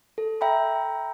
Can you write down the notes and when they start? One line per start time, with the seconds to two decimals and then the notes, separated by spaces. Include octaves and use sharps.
0.18 A4
0.41 E5 G5 A#5 B5